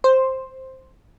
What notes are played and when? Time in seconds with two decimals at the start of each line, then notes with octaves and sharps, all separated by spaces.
0.04 C5